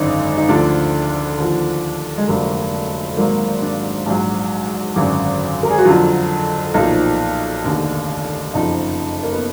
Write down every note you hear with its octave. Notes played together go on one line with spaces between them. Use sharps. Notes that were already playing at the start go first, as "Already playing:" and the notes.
Already playing: G#1 F#2 D3 D#4
D#4
D2 D3 F3 D4
D#2 D3 F3
G#3
F1 F2 D3 F#3 A#3
G#1 G#2 F#3 A#3
D4
A#1 G#2 F#3
G#1 F#2 D3 F#3
A#4
G#4
F#4
F2 D3 F#3 F4
B1 A#2 F3 D#4
F1 D#2 D3
F#1 F2 F3 D#4
A#3
B3